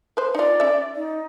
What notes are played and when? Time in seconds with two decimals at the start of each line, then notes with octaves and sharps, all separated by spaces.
0.17 B4 C5
0.35 D#4 F4 D5
0.60 C#4 E5
0.95 D#4